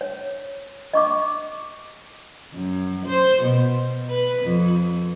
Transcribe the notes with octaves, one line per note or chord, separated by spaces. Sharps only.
C#5
D#5 C#6 D6
F#2
C5
B2
B4
F2